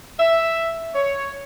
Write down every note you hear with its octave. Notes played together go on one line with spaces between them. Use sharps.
E5
C#5